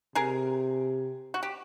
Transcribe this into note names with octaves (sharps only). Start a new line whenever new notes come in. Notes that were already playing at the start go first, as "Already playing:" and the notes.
C3 G#4 A#4
F#4
G4